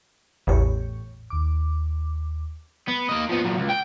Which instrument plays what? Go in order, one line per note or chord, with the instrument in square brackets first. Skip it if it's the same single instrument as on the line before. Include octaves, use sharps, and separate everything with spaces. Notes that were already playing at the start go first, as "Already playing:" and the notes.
[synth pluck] A1 E2 [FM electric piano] A2 G4 C#5
[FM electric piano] D#2 D6
[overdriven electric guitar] B3
A#3 D#5
F3 B3
A#2 F#3
C#2
G5